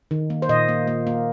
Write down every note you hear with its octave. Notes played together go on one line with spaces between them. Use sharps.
D#3
A#3
C5
A#2 D#5
A#3
A#3
A#3